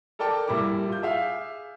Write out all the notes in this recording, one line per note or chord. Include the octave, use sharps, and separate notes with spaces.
A4 A#4 D5 G5 A5 D6
A#1 G3 A#3 E4 D6
F4 G6
G#4 E5 F5